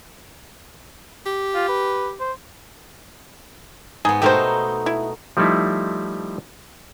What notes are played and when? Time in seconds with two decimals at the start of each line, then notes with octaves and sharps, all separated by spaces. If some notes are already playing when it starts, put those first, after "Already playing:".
1.26 G4
1.55 F4
1.68 B4
2.20 C5
4.05 G#2 B3 G#4
4.22 B2 A3 D#4 G4 A#4 C5
4.86 E4
5.37 F3 G3 A3 D#4 E4